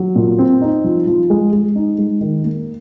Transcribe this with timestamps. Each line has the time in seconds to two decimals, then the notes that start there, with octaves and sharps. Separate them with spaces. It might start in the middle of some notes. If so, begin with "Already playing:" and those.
Already playing: F#3
0.15 A#2
0.38 C4
0.61 D#4
0.84 F3
1.07 F3
1.30 G#3
1.52 G#3
1.75 D#4
1.98 G#3
2.21 D#3
2.44 A#3